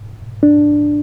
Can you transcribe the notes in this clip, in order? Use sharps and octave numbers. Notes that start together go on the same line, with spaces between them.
D4